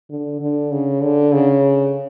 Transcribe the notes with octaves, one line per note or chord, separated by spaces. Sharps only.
D3
D3
C#3
D3
C#3